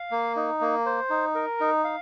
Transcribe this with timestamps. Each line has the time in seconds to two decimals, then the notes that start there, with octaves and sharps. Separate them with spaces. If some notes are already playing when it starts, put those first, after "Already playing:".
Already playing: F5
0.11 A#3
0.36 D#4
0.61 A#3
0.86 C5
1.10 D#4
1.35 A#4
1.60 D#4
1.84 F5